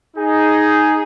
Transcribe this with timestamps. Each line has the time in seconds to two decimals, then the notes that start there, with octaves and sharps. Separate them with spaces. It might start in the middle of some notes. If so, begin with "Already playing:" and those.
0.16 D#4 G#4